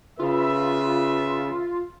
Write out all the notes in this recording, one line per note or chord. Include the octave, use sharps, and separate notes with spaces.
C#3 F4 B4 E5